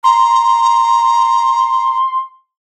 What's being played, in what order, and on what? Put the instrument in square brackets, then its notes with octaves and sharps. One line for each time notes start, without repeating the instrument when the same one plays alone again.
[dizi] A#5 [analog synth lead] C6